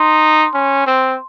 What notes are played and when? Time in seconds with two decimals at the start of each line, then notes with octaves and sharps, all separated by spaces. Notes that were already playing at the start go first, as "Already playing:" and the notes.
Already playing: D#4 C6
0.54 C#4
0.87 C4